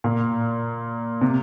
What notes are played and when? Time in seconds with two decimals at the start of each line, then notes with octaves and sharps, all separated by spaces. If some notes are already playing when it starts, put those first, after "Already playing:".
0.04 A#2
1.21 C3